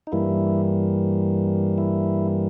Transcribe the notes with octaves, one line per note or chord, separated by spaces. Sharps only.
D#4
G2 E3 G3 A#3 E4
E4